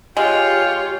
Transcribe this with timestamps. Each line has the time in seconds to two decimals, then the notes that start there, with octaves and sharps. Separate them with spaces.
0.17 G#3 F4 G4 C#5 F5 G5